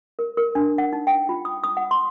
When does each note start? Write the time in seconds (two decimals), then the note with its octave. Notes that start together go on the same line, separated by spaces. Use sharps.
0.19 A#4
0.37 A#4
0.55 D4
0.78 F#5
0.93 D#4
1.07 G5
1.29 F4
1.45 D#6
1.64 D#6
1.77 F#5
1.91 C6